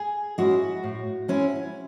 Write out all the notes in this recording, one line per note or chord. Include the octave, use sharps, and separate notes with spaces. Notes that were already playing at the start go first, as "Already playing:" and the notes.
Already playing: G#4
G#3 C#4 E4 F#4
A2
G#3 C#4 E4